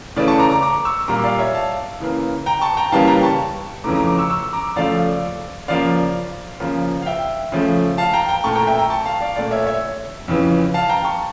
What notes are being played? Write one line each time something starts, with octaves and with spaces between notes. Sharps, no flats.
C#3 E3 A3 D5
A5 C#6
A#5 D6
A#5 D6
A#5 D6
C#6 E6
A#2 G3 A#3 A#5 D6
D5 F5
C#5 E5
F5 A5
C#3 E3 A#3
G5 A#5
A5 C#6
G5 A#5
C#3 E3 G3 A#3 F5 A5
G5 A#5
A5 C#6
F2 C#3 E3 A3 A#5 D6
A#5 D6
A#5 D6
C#6 E6
C#6 E6
A#5 D6
C#3 F3 A3 D5 F5
C#3 F3 A#3 D5 F5
C#3 F3 A#3
F5
E5 G5
C#3 F3 A3
F5 A5
G5 A#5
G5 A#5
A#2 A3 A5 C#6
G5 A#5
E5 G5
G5 A#5
A5 C#6
F5 A5
D5 F5
A#2 A3 D5
C#5 E5
C#5 E5
F2 C#3 E3
F5 A5
G5 A#5
A5 C#6